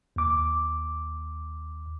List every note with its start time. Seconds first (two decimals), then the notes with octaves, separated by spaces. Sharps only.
0.16 D#2 D6